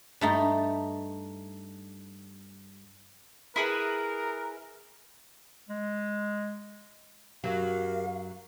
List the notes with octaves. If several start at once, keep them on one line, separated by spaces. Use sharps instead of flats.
G2 A3 D#4
E4 G#4 A#4 B4
G#3
F#2 F#3 G4 A#4 F5